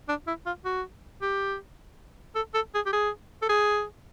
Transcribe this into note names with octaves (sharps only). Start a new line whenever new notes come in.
D4
E4
F4
F#4
G4
A4
A4
G#4
G4
G#4
A4
G#4